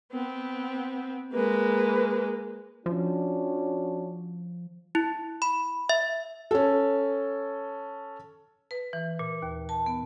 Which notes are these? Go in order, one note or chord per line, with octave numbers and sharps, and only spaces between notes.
B3 C4
G#3 A#3 B4
F3 C#4 D4 F#4
E4
B5
E5
C#4 A4
B4
E3
A#2
D#2
A5
B3